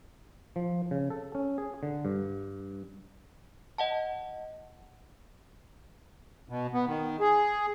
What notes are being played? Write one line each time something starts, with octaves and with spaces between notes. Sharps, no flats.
F3
C#3
A4
C#4
G#4
D3
G2
D#5 F#5 A5
B2
B3
D#3
G#4